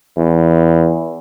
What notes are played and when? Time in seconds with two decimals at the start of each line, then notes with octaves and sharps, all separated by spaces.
0.17 E2